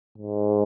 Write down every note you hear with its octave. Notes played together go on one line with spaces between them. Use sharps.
G#2